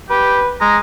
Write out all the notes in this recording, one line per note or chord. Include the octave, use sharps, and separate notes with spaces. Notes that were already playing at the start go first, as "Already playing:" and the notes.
G4 B4
G#3 A#5